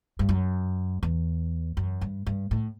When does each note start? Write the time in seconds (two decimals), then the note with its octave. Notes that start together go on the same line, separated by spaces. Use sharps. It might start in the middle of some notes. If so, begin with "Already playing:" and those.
0.19 G2
0.29 F#2
1.03 E2
1.77 F#2
2.01 G2
2.27 G2
2.51 A2